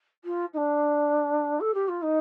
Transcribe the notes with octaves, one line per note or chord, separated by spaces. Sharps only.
F4
D#4
D4
A4
G4
F4
D#4